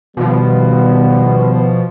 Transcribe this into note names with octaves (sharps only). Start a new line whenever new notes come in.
B2 D#3 F3 G3 B3